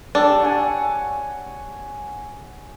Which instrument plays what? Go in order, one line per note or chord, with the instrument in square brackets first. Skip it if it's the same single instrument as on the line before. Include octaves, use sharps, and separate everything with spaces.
[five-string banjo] D4 [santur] G4 A4
[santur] C#5 F#5 G#5